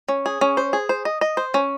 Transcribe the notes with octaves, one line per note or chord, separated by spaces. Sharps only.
C#4
G#4
C#4
C5
G#4
C5
D#5
D#5
C5
C#4